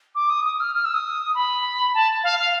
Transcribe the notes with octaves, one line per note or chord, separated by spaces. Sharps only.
D6
D#6
D#6
F6
F6
E6
D#6
B5
A5
F5
F5